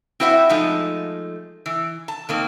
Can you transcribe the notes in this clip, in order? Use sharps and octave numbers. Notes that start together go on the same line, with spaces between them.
C4 E4 F#4 C5 E5 F#5
F3 G#3 A3 D#4
E3
A5
D#3 A#3 C4